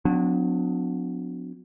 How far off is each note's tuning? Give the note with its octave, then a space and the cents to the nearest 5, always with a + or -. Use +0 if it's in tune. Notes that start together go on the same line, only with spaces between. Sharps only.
F#3 -35 B3 +45 D4 +0